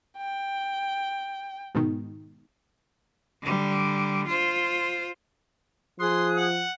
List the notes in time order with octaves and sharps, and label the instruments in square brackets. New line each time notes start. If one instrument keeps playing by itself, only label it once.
[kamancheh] G5
[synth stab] G#2 B2 D#3
[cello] D3 G3
F4 C5
[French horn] F3 [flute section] G#4 D#6 F#6 [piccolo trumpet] C6
[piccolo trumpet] F#5